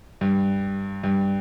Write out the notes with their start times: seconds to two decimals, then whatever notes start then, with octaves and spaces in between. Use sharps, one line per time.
0.21 G2
1.03 G2